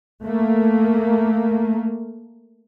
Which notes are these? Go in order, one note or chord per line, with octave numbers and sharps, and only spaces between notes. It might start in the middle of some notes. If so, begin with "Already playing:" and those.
A3 A#3